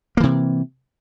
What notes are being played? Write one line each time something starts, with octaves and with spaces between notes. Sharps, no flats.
C3 E3 A#3